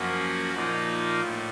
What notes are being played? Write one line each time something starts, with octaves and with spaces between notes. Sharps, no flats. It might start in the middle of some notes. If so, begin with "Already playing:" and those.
Already playing: F#2 F3 A#3 C#4 F#4
A#2 F3 A#3 D#4
A2